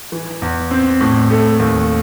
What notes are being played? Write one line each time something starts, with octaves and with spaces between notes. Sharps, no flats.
E3
E2
C4
A2
A3
D#2